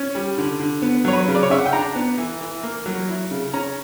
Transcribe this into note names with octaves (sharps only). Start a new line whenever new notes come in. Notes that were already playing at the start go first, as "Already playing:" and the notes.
Already playing: C#4
G3
D3
D3
B3
F#3 C#5
B4
C#3
D5
C#5
C#3 E5
F#5
G5
D4 A#5
B3
E3
E3
A#3
F#3
E4
C#3
C#4 A#5